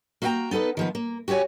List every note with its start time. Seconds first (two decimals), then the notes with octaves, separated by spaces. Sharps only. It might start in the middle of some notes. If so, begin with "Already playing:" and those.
0.22 A#3 F#4 E5 F#5 G5 A#5
0.51 B3 D#4 A4 B4 D#5
0.77 D#3 F3 B3
0.95 A#3
1.28 F#4 G4 A4 C#5 G#5